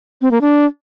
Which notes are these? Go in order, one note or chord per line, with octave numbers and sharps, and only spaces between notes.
C4
A#3
D4